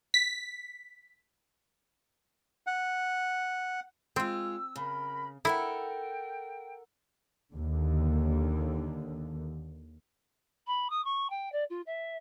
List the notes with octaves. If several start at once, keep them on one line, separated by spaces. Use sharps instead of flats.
B6
F#5
G#3 C4 F4 E6
C#3 A#4 B5
E4 A4 A#4 F#5 G5
D#2 D3
B5
D#6
C#6
G5
D5
F4
E5